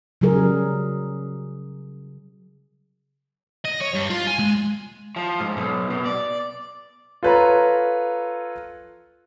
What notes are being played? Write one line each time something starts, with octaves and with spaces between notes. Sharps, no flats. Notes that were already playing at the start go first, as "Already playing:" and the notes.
C#3 F#3 G3 G#4 A#4
D#5
C#5
G2
F4
G#5
G#3
F3
G#2
B1
B2
D5
F4 A4 B4 C#5 A#5